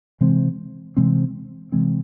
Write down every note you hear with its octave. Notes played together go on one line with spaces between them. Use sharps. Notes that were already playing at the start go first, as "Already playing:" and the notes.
C3 E3 G#3 C4
C3 E3 G#3 C4
C3 E3 G#3 C4